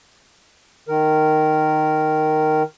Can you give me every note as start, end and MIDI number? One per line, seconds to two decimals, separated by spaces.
0.88 2.63 51
0.88 2.63 70